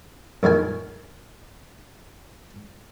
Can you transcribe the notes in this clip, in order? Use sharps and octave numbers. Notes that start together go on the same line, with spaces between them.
A#1 F#2 D#3 G#5